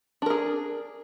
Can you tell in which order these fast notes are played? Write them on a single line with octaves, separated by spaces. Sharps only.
D4 A#4 G#4